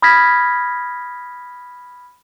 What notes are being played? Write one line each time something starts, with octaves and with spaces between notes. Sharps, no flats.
B5 D#6 F6 G#6 A#6 B6